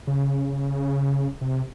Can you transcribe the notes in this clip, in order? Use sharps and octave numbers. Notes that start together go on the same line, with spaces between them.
C#3
C3